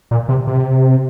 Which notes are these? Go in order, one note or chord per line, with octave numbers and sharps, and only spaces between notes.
A#2
C3
C3